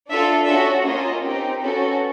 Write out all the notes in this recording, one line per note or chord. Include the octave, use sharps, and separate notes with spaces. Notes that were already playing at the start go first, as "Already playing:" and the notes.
D4 F4 A4 E5
C#4 F#4 A4 E5
A#3 C#4 F4 D#5
C4 D#4 G4
C#4 F#4 A4 B4